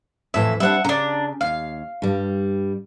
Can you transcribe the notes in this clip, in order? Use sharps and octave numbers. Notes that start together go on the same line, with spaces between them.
F2 A2 E3 E5
G3 C4 D4 E5 F#5
C#3 D4 A#5
D#2 F5
G2 G3